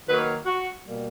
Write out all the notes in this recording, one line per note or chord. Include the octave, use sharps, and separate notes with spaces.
D#3 F#3 A#3 B4
F#4
B2 G3 A#3